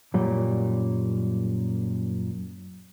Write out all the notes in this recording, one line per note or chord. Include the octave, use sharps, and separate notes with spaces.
F#2 A#2 G3